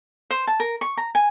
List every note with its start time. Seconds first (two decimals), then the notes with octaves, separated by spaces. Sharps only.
0.31 C5
0.47 A5
0.60 A#4
0.81 C#6
0.97 A#5
1.15 G#5